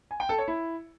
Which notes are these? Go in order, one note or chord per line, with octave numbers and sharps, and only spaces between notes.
G#5
G5
A4
C#5
E4